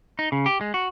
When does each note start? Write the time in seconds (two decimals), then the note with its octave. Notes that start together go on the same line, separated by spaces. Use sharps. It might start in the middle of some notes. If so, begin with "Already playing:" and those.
0.19 D#4
0.32 C#3
0.46 G4
0.61 G#3
0.74 F#4